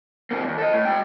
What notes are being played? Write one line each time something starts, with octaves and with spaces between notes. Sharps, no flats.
C3 A#3
D#2 G#2
A4 D#5
A2
G#3 G5